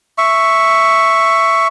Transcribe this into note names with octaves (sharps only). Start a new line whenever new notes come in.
E5 C#6